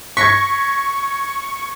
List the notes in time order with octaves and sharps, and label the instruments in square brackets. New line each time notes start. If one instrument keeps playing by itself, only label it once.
[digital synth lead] C#6 [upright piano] G#6 A#6 B6